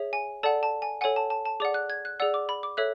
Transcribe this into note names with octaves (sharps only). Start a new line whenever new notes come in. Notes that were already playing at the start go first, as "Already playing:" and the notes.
Already playing: G#4 C#5 E5
G#5
A4 D5 F#5 A5
A5
G#5
A4 C#5 F#5 G#5
A5
A5
A5
G#4 D5 F#5 D6
F#6
G#6
F#6
G#4 D5 F#5 E6
D6
B5
D6
A4 C#5 E5 F#6